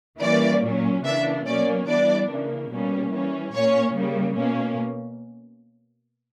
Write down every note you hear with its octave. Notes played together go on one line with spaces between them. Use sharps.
E3 G3 A#3 C#4 D5
A#2 F#3 C#4
C#3 E3 A#3 D4 E5
B2 F#3 A#3 C#4 D5
E3 G3 B3 D4 D5
C#3 E3 A#3
B2 G3 A#3 C#4
E3 G3 C#4
A#2 A#3 C#4 C#5
C#3 G3 A#3
B2 A#3 C#4